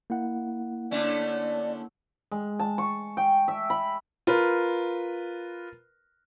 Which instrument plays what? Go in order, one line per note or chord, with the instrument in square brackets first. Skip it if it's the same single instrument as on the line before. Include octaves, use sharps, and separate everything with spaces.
[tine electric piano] A#3 E4 F#5
[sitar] D3 A3 C#4 [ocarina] D5
[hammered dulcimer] G#3
A5
C#6
G5
E5
B5
[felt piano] F4 A#4 B4